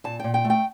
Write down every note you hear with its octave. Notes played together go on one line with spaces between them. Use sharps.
A#2 A5
A#2 G5
G5
A3
G5